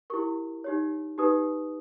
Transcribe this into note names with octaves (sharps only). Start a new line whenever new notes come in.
E4 G4 A#4 C#6
D#4 G4 C#5
D#4 G4 B4 D#6